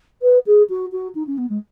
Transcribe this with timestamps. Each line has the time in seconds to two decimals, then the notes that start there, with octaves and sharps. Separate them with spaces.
0.22 B4
0.46 G#4
0.69 F#4
0.92 F#4
1.15 D#4
1.27 C#4
1.38 B3
1.49 G#3